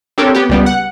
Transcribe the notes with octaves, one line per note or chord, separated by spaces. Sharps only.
C4 D4 G4 A4 A#4 C#5
B3 G4
C#2 G3 B3
F#5